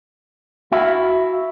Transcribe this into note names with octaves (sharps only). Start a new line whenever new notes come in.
E4 F#4 E5 F5